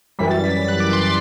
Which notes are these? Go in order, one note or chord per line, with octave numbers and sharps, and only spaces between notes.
F#2 E3 G3 B6
A6
B6
A6
F#6
D6
C6
C6